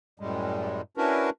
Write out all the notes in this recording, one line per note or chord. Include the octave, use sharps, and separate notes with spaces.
F#2 A2 G3 G#3
C#4 D4 E4 F#4 A#4 B4